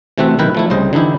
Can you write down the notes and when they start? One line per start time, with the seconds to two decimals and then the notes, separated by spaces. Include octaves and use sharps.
0.18 C3 E3 A3 C4 F#4 E5
0.39 B1 D#3 E4 A#4 B4 G5
0.55 F3 A3 E4
0.70 C2 C#3 G3 C5 D#5
0.93 D3 E3 D#4 E4 G4